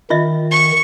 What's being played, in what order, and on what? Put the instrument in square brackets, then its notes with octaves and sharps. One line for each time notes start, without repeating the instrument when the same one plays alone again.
[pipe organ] D#3 [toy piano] F4 D#5 E5
[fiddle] C#6